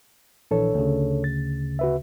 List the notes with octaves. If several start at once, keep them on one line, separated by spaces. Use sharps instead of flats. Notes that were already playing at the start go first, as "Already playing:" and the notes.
A#1 E3 D4 A4 C#5
D2 C#3
A6
F#4 B4 E5